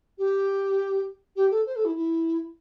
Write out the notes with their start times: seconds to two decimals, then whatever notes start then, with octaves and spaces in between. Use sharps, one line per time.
0.18 G4
1.36 G4
1.51 A4
1.66 C5
1.76 A4
1.85 E4
1.96 E4